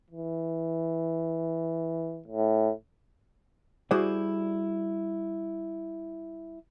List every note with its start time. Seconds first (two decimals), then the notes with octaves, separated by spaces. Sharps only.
0.11 E3
2.28 A2
3.91 G3 E4 F#4 G#4 C5 D5